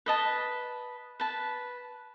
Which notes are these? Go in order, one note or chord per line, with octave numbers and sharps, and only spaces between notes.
B4 D#5 A5
B4 A5